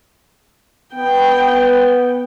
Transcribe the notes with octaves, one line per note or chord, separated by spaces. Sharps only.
B3 G5